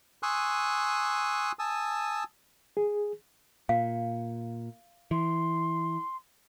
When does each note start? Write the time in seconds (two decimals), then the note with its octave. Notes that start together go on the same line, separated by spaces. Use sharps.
0.23 G#5 C6 C#6 D#6 E6 F#6
1.59 G#5 A5 D#6 E6
2.77 G#4
3.69 A#2 F5
5.11 E3 C6